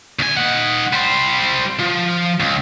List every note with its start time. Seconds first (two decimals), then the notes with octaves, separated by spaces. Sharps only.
0.19 D2 G#5
0.37 D#4 F#5
0.93 G3 C5
1.79 F3
2.40 C#2